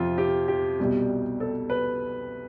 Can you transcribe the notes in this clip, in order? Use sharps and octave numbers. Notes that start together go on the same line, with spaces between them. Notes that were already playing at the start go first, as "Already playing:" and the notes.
Already playing: F2 C3 F3 F4
G4
G4
C2 B2 G3
A4
B4